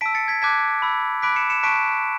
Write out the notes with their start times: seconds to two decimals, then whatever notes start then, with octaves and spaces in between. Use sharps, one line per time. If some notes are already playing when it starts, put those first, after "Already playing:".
0.01 A5 E6 B6 D7
0.15 A6 C#7
0.28 G#6 B6
0.42 A5 D6 F#6 G#6 B6
0.82 B5 E6
1.22 B5 D6 F#6 B6 D7
1.36 C#7 E7
1.50 C#7 E7
1.63 A5 C#6 F#6 B6 D7